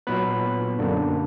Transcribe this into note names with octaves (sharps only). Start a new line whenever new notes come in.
A#2 F#3 B3 B4 B5
F#2 D3 A#3 D4